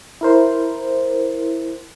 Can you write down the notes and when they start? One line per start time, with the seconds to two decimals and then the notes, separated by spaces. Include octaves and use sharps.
0.21 E4 A#4 C5